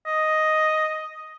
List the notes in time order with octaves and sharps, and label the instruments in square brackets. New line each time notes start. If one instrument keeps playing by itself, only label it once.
[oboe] D#5